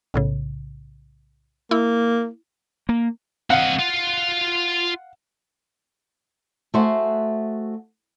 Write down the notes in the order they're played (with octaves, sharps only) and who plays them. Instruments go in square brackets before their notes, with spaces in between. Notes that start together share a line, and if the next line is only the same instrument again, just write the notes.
[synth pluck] B1 A2 C#3
[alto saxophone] A#3 [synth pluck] E4
[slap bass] A#3
[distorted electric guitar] C4 D#5 [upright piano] F5 F#5
[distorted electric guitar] F4
[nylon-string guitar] A3 F#4 G#4 C5 E5 F#5